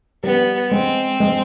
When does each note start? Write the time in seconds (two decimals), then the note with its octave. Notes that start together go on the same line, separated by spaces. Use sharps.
0.23 G3 B3
0.71 G#3 C4
1.20 G#3